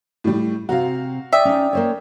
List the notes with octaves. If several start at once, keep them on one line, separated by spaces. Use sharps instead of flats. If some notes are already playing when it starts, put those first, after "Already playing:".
A2 G3
C3 C4 F#4 F5 A#5
D5 E5 G5 D#6
C#4 D#4
A#3 C5 C#5